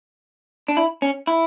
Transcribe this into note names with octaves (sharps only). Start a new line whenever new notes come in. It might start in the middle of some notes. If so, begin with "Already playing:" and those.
D4
E4
C#4
E4